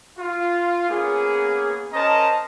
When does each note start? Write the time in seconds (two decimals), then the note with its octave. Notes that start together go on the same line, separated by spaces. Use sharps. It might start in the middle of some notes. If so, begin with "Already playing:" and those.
0.18 F4
0.90 A#3 B3 C#4 G#4
1.93 C#4 A#4 C5 D#5 A5 A#5